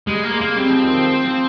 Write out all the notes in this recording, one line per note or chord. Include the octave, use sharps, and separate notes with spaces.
G3 G#3
A#3
G#3
A#3
G3 C4
F3
D#3
F3
G#3
F3